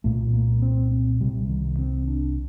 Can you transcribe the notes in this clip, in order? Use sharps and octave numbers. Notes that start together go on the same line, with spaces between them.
C2 A#2 A3
A#3
C4
C4
C2 C3 G3
D#3
C4
D4